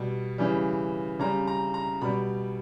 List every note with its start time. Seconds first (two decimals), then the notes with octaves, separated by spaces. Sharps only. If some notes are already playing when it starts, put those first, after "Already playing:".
Already playing: B2 G3
0.38 C#3 E3 G3
1.20 C#3 G3 A#5
1.47 A#5
1.74 A#5
2.01 B2 G3 B5